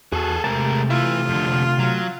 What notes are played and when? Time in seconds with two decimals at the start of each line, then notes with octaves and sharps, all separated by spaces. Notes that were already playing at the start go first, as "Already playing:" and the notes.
0.12 E2 F#4 G#4 A4
0.44 C3 G#3 A3 G4 A#4 A5
0.90 E3 E4 F4
1.29 F2 D3
1.79 F#3